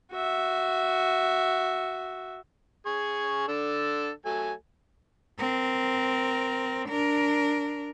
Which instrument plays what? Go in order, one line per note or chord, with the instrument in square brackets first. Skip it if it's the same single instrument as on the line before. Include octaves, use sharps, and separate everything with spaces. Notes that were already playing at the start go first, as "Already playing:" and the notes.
[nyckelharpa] F#4 E5
[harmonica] G#4 C#6
D3 D4 A4
F#3 A3 G#5
[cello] C4 A#4
D4 A#4